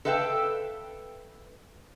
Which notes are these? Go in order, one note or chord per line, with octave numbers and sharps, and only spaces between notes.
A4 B4 E5 F5 G5